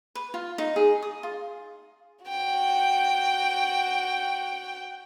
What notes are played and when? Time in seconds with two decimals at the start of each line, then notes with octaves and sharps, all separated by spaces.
0.15 B4
0.34 F4
0.58 D#4
0.76 G#4
1.02 D#6
1.23 F4
2.25 F#4 G5